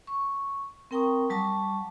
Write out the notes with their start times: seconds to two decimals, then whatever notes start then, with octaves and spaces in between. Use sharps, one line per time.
0.07 C#6
0.91 C4 A#4 G5 A#5 C#6 D#6
1.30 F#3 G3 A5 C#6 D6